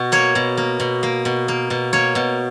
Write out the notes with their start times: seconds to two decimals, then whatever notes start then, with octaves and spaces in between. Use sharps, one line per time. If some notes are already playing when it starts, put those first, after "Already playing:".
Already playing: B2 F#4
0.12 A#3 C#5
0.35 B2
0.57 A#3
0.80 B2
1.03 A#3
1.25 B2
1.48 A#3
1.70 B2
1.93 A#3 C#5
2.15 B2